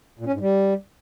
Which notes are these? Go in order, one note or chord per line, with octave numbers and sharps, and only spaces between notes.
A#2
C#4
G#2
G3